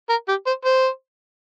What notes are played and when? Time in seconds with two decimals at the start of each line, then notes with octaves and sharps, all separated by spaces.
0.10 A#4
0.28 G4
0.47 C5
0.65 C5